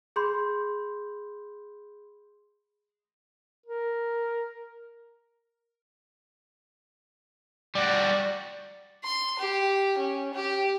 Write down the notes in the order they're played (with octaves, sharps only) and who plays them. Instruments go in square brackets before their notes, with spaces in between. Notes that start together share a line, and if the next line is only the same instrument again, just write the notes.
[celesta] G#4 B5 C6 G6
[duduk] A#4
[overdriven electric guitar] G3 F#4 [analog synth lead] D5
[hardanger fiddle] C6
G4
C#4
G4